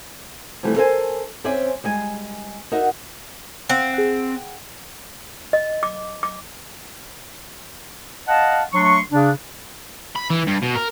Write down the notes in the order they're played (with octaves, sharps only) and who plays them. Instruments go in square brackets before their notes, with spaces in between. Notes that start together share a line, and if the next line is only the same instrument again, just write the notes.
[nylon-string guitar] C3 E3 F3 G3 A3
A4 A#4 C5 F5 G#5 A5
C4 C#4 C5 D5 E5 G#5
G3 G#3 G#5
D#4 F#4 A#4 D#5 E5
[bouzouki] C4 [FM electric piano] F5 F#5
[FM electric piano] G#4 F#5
[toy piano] D#5
D6
D6
[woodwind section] D#5 F5 F#5 A5
F#3 A3 D4 C6 C#6
C#3 D4
[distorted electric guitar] B5
E3
G2
B2
A#4